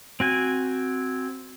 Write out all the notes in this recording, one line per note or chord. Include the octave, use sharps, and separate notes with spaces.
C4 F#4 G#5